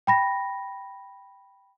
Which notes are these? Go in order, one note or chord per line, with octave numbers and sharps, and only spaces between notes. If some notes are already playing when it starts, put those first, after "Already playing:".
G5 B5 A#6